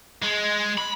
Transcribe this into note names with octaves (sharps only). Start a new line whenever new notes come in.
G#3
B5